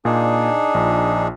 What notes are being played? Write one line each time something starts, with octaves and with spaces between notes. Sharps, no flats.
A#2 D4 D#4 G#4
A#1 F4